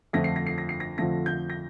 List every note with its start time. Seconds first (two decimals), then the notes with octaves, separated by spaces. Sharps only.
0.13 F2 D3 F3 A3 A#6
0.24 C7
0.36 A#6
0.47 C7
0.58 A#6
0.69 C7
0.80 A#6
0.98 F2 D3 F3 A3 A#6
1.26 G6
1.50 A#6